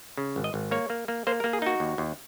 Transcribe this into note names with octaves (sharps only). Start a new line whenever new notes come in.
C#3
G#1
D#5
G#1
A#3 C#5
A#3
A#3
A#3 C5
A#4
A#3
G#4
D#4 F#4
D#2
D#2